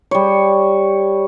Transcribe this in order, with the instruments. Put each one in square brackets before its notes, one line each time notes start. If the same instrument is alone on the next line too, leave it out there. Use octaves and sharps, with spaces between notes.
[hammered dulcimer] G3 C#5